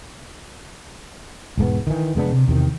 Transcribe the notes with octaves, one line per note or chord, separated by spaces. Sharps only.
E1 G#2 A3 B3
D#3 E3
F1 G#3 B3 D4
C3
E2 C3 D#3